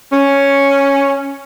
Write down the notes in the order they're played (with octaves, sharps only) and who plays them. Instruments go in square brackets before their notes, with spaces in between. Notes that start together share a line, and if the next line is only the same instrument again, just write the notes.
[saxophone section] C#4